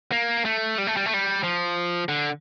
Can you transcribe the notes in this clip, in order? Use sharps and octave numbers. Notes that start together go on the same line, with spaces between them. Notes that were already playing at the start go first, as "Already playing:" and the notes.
A#3
A3
G3
A3
G3
A3
G3
F3
D3